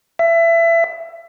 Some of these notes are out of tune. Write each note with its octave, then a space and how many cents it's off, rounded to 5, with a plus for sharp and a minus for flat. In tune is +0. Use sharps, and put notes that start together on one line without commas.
E5 +25